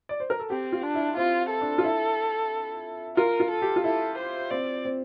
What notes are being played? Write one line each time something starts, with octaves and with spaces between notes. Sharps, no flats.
D5
C5
A#4
A4
C4 G4
F4
D4
E4
C4 F4
A4
D4
F4
E4
F4 A#4
F4
A4
G4
F4
E4 A4
C5
C4 D5
C4